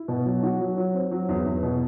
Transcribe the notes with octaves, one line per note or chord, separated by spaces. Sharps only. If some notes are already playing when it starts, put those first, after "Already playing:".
Already playing: E4
B2
F#3
F#4
F#3
F#3
C4
F#3
E2
E2
B2